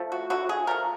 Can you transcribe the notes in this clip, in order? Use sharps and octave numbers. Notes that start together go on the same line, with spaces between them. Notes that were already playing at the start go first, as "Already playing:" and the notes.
Already playing: F3 A3
F#4
D3 F#4
G#4
F3 A3 A#4